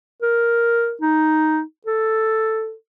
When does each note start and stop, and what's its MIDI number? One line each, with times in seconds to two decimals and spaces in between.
0.22 0.94 70
1.02 1.61 63
1.87 2.74 69